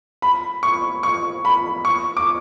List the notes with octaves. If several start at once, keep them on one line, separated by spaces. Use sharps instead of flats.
B5
C#6
C#6
B5
C#6
D6